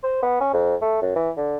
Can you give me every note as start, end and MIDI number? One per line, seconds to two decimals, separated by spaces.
0.03 0.20 72
0.23 0.37 59
0.41 0.50 61
0.54 0.75 41
0.82 1.00 57
1.02 1.15 42
1.16 1.31 52
1.37 1.58 50